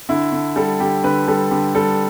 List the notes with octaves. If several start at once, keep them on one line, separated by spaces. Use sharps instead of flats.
D3 E4
D3
G3 A4
D3 G4
D3 B4
G3 A4
D3 G4
G3 A4